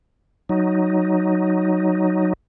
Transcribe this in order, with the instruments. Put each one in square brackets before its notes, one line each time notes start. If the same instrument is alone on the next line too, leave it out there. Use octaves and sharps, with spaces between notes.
[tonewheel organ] F#3 D#4